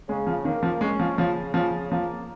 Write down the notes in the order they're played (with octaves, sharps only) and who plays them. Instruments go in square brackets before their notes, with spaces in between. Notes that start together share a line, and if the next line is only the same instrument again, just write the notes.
[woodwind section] C#3 [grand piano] G#3
[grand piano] F3
[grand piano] D#3 [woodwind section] A#3
[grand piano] F3
[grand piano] G#3 [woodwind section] C#4
[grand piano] F3
[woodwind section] C#3 [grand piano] F3
[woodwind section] C#3 [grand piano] F3
[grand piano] F3 [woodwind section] A#3